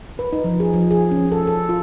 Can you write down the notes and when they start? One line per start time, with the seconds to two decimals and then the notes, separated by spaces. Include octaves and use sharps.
0.19 B4
0.33 D#4
0.44 F3
0.60 G#4
0.73 F3
0.91 G#4
1.11 C#4
1.32 A4
1.47 A4
1.69 F4